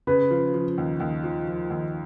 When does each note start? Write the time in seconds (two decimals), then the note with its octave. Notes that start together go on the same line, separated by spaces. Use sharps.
0.07 C#3 B4
0.31 F3
0.54 F3
0.78 D#2
1.00 D#2
1.24 F3
1.48 F3
1.70 D#2